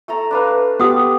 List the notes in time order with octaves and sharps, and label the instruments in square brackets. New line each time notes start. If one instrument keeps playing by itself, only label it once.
[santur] A3 A4 A#5
D4 B4 F5
[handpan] B3 G4 [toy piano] F#4 F#5 D#6